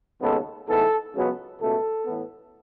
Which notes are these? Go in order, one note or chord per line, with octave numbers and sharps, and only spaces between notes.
D#2 C#3 G#3 B3 A4
G#2 E3 B3 A4
C#2 C#3 F#3 B3
C#2 B2 A3 A4
A2 E3 B3